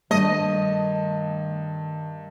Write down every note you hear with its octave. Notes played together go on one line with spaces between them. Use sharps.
G2 D#3 A3 D#5